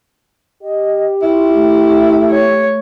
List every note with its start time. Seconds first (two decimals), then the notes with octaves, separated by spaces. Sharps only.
0.62 G4 D#5
1.22 E4 F4
1.53 A3
2.31 C#5